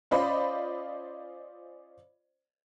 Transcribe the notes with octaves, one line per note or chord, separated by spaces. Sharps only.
C#4 F4 C5 D5 D#5 B5